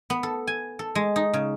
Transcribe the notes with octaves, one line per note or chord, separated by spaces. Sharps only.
B3
A4
G#5
A4
G#3
D#4
C#3